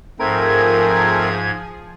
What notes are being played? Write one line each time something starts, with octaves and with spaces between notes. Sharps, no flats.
G#2 F3 A3 C4 G#4 A#4 G#6